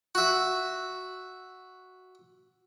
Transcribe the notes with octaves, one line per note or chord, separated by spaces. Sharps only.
F#4 E5